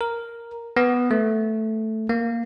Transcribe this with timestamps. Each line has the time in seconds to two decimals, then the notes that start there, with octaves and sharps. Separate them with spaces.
0.01 A#4
0.77 B3
1.11 A3
2.09 A#3